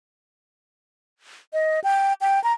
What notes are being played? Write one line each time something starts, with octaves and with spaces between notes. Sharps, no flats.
D#5
G5
G5
A#5